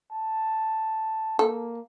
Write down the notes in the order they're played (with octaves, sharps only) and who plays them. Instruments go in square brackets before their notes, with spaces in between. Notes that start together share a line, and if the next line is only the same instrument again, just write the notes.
[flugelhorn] A5
[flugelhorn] A#3 [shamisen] A4